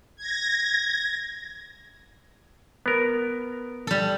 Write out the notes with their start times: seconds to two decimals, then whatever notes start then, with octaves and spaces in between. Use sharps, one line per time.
0.16 G#6 A#6
2.86 B3 A#4
3.87 G3 A4